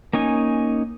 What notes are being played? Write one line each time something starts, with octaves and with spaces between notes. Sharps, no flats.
A#3 C#4 D#4 G#5